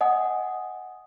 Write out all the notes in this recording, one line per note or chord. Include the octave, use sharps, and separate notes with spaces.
D#5 F#5 G#5 D#6